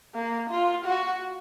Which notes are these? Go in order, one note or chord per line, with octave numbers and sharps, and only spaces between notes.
A#3
F4
F#4